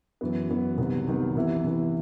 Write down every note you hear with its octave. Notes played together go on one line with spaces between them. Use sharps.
F#2 E3 B3
F#2 E3 B3
C2 C3 D#3 F#3 B3
C2 C3 D#3 F#3 B3
C3 E3 B3 E4
C3 E3 B3 E4